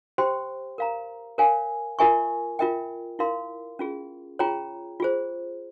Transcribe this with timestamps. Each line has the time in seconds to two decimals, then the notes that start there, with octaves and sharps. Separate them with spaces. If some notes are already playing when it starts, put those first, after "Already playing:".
0.18 G4 C5 G5 C6
0.78 A#4 F5 A#5
1.38 A#4 C#5 F5 G#5
1.99 F4 A#4 E5 G#5 C#6
2.59 F4 A#4 E5 G5
3.19 E4 A#4 F5 C6
3.79 C#4 F4 G#4
4.39 F4 G#4 C#5 G5 A#5
5.00 F4 G#4 C5